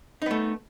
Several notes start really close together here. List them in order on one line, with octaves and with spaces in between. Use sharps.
D#4 B3 A3